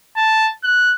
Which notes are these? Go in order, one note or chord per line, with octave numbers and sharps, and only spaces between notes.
A5
F#6